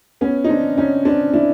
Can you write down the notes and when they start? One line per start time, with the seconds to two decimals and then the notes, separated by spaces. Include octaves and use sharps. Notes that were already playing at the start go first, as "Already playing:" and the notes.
0.21 B3 C#4
0.44 D#4
0.49 C4 D4
0.77 C#4 D#4
1.05 C4 D4
1.33 D4 E4